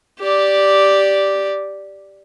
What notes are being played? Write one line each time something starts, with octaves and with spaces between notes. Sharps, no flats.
G4 D5